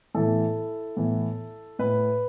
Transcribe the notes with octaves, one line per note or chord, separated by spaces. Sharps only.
A2 E3 B3 E4 A4
A2 E3 B3
A2 B4